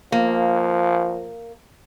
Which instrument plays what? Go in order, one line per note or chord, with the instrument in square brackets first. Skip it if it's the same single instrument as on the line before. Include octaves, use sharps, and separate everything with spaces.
[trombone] F3 [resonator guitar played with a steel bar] A#3